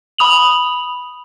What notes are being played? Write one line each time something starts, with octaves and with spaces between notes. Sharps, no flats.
B5 D#6 F7 F#7